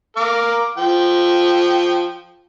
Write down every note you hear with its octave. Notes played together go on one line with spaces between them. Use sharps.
A#4 F5 D6
F3 G5